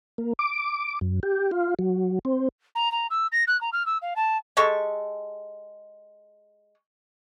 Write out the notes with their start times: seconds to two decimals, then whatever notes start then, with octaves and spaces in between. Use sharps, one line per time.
0.18 A#3
0.39 D6
1.01 F#2
1.23 G4
1.51 F4
1.79 F#3
2.25 C4
2.75 A#5
2.92 A#5
3.10 E6
3.32 A#6
3.47 F#6
3.61 A#5
3.73 F6
3.86 E6
4.02 F5
4.16 A5
4.57 G#3 G4 A4 C#6